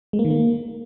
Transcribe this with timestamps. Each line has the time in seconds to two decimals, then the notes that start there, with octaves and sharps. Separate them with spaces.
0.13 G#3
0.19 A#3
0.25 D#3
0.30 A#3